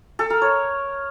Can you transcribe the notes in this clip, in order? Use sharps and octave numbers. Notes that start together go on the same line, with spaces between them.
A4
A#4
C#5